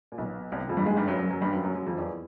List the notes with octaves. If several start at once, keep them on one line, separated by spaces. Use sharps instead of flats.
A#2
B1 B2
C2 C3
F2 F3
G2 G3
G#2 G#3
G2 G3
F#2 F#3
F#2 F#3
F#2 F#3
G2 G3
F#2 F#3
F#2 F#3
F#2 F#3
F2 F3
E2 E3